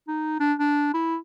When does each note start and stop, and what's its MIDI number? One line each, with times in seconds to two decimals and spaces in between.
0.08 0.36 63
0.40 0.54 62
0.59 0.90 62
0.94 1.16 64